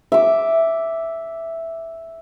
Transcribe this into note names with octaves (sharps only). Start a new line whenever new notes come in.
E5 D6